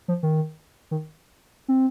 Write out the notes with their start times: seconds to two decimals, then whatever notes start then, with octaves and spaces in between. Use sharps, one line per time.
0.08 F3
0.23 D#3
0.91 D#3
1.68 C4